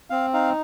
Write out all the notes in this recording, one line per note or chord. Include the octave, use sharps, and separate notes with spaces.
C4 F5
D#4 F5